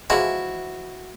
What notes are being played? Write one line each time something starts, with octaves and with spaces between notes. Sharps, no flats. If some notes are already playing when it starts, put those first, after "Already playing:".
E3 F3 G#3 E4 F#4